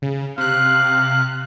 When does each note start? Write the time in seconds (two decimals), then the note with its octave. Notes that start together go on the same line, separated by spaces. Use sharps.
0.02 C#3
0.38 C3 F5 F#6